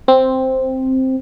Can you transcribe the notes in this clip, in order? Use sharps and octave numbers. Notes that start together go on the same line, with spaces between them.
C4